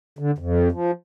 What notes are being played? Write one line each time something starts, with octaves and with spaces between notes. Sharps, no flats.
D3
F2
F3